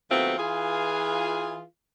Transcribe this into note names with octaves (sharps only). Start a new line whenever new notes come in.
D#2 F#3 A3 B3 C4 F4
E3 F4 G#4